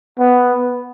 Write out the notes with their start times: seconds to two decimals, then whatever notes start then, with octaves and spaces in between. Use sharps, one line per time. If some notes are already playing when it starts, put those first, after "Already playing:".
0.19 B3